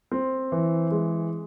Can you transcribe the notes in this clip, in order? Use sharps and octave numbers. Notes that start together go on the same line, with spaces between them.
C4
E3
G#3